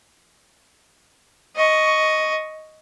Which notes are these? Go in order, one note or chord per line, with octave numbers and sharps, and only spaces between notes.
D#5 C#6